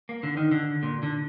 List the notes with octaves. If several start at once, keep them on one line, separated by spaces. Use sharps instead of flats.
A#3
D3
D#3
D3
A#2
D3